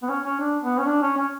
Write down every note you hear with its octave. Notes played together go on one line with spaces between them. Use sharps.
B3
C#4
C#4
D4
B3
C#4
D4
C#4
C#4